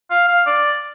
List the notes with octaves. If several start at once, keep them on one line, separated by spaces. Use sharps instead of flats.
F5
F5
D5